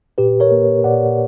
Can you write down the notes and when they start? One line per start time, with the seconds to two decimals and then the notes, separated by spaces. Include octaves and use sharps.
0.18 A#2 G4 B4
0.40 A#4 C#5
0.51 A#3
0.84 A#2 D5 F#5